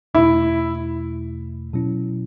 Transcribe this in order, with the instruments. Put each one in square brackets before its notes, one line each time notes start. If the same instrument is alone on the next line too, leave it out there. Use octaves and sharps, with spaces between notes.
[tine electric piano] E2 B2 A3 [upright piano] E4
[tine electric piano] B2 F#3 C#4 E4